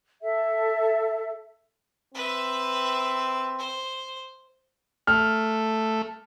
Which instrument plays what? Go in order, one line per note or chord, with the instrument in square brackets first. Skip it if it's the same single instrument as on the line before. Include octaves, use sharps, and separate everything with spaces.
[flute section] A4 E5
[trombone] C4 [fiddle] B4 E5
[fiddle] C5
[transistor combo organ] A3 [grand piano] F6